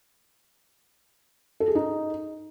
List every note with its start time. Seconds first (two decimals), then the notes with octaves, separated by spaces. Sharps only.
1.60 A4
1.68 G#4
1.75 D#4